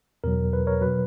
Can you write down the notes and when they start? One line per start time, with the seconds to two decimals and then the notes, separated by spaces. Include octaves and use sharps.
0.24 E2 B2 F#3 A#4
0.53 B4
0.67 A#4 C#5
0.81 B2 F#3 B4